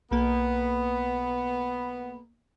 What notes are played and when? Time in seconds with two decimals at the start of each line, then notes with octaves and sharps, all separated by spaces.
0.11 B1 A#3 B3